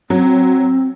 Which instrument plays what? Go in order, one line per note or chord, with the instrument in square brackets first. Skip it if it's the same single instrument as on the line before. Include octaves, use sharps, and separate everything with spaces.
[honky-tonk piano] F#3 [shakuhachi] C4